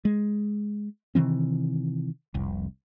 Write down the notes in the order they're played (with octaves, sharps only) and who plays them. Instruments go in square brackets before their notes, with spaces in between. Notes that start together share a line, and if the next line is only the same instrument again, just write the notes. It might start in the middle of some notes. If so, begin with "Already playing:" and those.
[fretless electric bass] G#3
C3 D#3 E3 C4
F1 C2